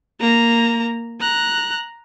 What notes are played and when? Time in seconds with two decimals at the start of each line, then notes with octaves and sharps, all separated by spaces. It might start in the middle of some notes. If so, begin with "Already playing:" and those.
0.21 A#3 A#5
1.21 A#5 F#6